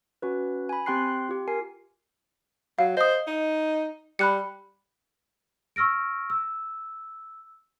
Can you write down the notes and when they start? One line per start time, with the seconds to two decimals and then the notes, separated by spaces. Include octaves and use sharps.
0.22 C#4 F#4 B4
0.69 G#5 B5
0.86 C4 G4 G5 C6 F#6 C7
1.29 F4 G4
1.48 A#4 G#5 C7
2.79 F#3 F5
2.97 C5 D#5 D#6
3.27 D#4
4.19 G3 B5 F#6 C#7
5.76 C#6 E6 F6 A#6 D7
6.30 E6